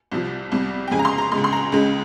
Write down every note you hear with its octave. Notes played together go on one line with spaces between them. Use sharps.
C2 C3 F3
C2 C3 G3
G5
F2 C#3 G#3 G#5
A#5
C6
A#5
C#2 C#3 G#3 C6
C6
A#5
C#2 C#3 G#3